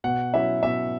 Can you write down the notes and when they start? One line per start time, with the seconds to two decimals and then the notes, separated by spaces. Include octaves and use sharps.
0.04 B2 F#5
0.34 F#3 C#4 E4 E5
0.63 B2 E5